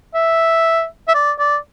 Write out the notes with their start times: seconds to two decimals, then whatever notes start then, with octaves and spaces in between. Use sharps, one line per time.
0.14 E5
1.08 E5
1.14 D5
1.39 D5